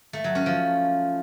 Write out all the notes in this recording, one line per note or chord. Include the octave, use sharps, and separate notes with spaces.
A3
F#3
C#4
F3